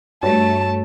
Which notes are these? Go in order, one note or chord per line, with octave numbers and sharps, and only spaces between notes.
G2 A3 F#4 C#5 A5 A6